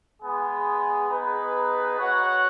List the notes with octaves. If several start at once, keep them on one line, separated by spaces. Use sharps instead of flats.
G#3 B3 G#4
B3 D#4 G#4 B4
F#4 C#5 F#5